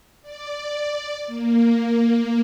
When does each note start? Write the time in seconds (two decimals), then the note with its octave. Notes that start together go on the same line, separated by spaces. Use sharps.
0.22 D5
1.27 A#3